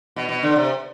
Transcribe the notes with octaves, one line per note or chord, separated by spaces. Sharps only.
B2
B2
D3
C3